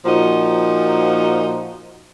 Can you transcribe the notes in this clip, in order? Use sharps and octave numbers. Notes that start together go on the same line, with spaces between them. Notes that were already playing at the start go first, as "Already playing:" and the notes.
A#2 F3 D#4 F#4